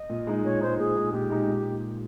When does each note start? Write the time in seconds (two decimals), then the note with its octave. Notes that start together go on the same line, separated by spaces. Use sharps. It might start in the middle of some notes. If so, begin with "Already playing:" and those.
Already playing: D#5
0.10 A#2
0.27 G#3 D#4
0.44 A#2 C#5
0.61 G#3 D#4 C5
0.78 A#2 G#4
0.96 G#3 D#4
1.12 A#2 G4
1.30 G#3 D#4
1.48 A#2